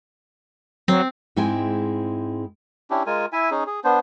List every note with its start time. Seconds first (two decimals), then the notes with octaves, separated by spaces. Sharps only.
0.88 F#3 C4
1.36 G#2 G#3 C4 E4 G5 G#5
2.90 C#4 D4 E4 G4
3.06 G#3 F4 A#4 G#5
3.33 E4 E5 G#5
3.51 C#4 D#4 G#4
3.67 G#4
3.84 B3 D4 C5